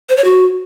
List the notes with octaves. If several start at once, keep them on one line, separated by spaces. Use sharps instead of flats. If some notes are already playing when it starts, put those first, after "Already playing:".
C5
C#5
F#4